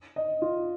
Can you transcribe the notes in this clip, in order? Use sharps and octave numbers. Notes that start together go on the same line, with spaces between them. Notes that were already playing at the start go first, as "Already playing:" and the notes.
D#5
F4